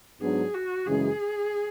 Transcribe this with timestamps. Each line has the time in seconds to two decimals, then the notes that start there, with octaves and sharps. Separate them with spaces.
0.21 G#2 F#3 B3 D4 G#4
0.54 F#4
0.87 F#2 C#3 E3 G#3 G#4